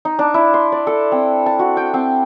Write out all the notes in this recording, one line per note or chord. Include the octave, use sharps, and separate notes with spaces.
D#4
D4
E4
C6
D5
A4
C4
A5
F#4
G5
C4